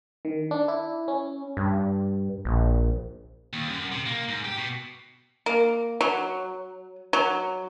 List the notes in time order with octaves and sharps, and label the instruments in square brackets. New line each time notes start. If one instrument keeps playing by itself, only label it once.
[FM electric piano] D#3
D4
E4
C#4
[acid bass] G2
A#1
[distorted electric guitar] D#2
F#2
C3
A#3
G#2
G4
B2
[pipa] A#3
F#3
F#3